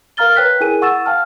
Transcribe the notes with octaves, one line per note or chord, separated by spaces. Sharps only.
A#4 F5 A#5 F6 A6 G7
B4 C#5 G5 F#6 B6
E4 G#4 A#4 G#5 D#7
F#5 C#6 E6 A6 E7
F5 G5 A5 F6